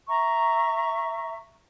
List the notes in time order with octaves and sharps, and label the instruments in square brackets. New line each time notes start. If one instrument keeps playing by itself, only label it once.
[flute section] E5 A#5 C#6